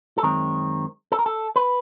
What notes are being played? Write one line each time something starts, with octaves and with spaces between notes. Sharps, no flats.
A4
F#2 D#3 G#3 C4 A#4
A4
A#4
A4
B4